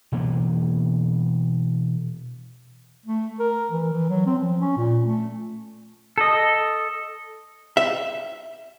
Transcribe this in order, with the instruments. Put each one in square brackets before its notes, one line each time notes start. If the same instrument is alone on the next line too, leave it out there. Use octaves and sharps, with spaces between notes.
[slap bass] B2 E3 A#3 B3
[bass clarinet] A3
A#4
E3
E3
F#3
C4
F3
C#4
A#2
A3
[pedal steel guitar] A4 D#5
[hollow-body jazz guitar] E5